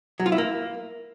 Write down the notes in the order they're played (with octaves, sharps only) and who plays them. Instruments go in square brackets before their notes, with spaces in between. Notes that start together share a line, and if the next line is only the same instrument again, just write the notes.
[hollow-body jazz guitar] F#3
F4
E4
A#3